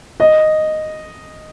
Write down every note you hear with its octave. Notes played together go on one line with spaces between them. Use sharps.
D#5